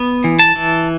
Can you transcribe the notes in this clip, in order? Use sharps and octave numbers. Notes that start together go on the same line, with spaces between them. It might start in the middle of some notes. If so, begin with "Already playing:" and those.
Already playing: B3
E3
A5
E3